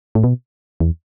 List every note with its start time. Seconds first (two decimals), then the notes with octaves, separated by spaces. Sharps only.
0.15 A2
0.24 B2
0.80 E2